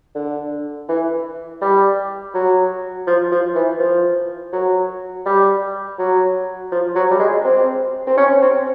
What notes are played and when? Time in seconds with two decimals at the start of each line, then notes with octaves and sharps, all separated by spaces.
0.15 D3
0.89 E3
1.61 G3
2.34 F#3
3.07 F3
3.31 F3
3.55 E3
3.79 F3
4.53 F#3
5.26 G3
5.99 F#3
6.72 F3
6.95 F#3
7.11 G3
7.20 G#3
7.44 C4
8.07 C4
8.17 C#4
8.42 C4